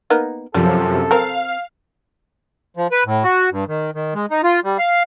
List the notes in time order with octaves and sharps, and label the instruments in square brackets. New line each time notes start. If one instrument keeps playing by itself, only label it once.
[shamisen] A#3 B3 D#4
[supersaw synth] F#2 C3 F3 [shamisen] G3 [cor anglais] A4
[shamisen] C4 A#4 [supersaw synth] F5
[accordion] F3
B4
A2
F#4
G2
D#3
D#3
G#3
D#4
F4
G3
F5